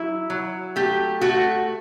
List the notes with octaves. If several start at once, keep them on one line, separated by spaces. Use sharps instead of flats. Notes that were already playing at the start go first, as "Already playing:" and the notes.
Already playing: F#3 E4
F#3
A3 G4
A3 F#4